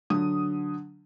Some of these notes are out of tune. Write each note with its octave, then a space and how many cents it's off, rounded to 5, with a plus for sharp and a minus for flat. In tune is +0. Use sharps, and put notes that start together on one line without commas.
D3 +0 F#3 +0 D#6 +0